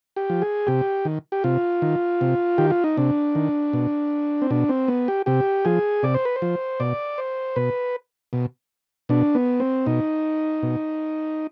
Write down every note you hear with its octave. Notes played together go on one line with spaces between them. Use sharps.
G4
F3
G#4
C3 G4
D#3
G4
C3 F4
D#3
C3
D#3 G4
F4
D#4
C3 D4
D#3
B2
C4
B2 D4
C4
B3
G4
C3 G4
F3 G#4
C3 D5
C5
B4
C5
F3
B2 D5
C5
B2 B4
B2
B2 D4
B3
C4
B2 D#4
B2